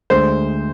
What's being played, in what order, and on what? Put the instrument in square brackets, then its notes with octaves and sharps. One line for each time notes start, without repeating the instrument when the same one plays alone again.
[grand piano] D2 D3 G#3 [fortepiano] C5